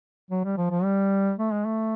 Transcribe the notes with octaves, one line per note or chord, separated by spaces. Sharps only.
F#3
G3
F3
F3
G3
A3
G#3
A3